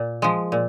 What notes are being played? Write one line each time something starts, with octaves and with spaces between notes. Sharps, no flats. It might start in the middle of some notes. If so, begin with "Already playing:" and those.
Already playing: A#2
F3 G#3
A#2